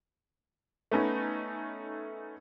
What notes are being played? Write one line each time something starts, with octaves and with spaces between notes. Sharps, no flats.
A3 B3 C#4 D#4